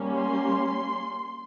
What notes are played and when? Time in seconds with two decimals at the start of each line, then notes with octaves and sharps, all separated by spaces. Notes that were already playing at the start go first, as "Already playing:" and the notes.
Already playing: G3 A#3 C#4
0.16 C6